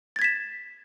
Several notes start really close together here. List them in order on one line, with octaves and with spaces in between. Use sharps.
A6 G#6 B6 E7